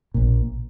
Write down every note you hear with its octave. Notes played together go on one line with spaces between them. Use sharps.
A#1 A#2